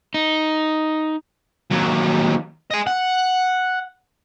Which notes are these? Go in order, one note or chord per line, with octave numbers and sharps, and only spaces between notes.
D#4
D#2 F#3
D#5 G#5
F#5